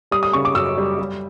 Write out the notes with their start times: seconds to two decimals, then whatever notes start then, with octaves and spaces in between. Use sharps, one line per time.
0.11 G3 D#6
0.23 D#6
0.33 C#3 C#6
0.45 D6
0.55 F#2 E6
0.78 G3
0.99 G3